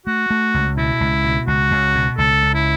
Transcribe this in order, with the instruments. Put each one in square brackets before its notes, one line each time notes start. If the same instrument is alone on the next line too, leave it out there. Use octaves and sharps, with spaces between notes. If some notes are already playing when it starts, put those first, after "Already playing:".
[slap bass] A3 [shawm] F#4
[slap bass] A3
C#2
[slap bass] B2 [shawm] E4
[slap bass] C#2
B2
[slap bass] C#2 [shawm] F#4
[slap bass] C#2
B2
[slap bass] C#2 [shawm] A4
[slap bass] C#2
[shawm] E4